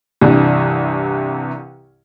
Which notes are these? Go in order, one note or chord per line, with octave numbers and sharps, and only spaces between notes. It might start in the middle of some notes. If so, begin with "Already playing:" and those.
C2 G2 C3 E3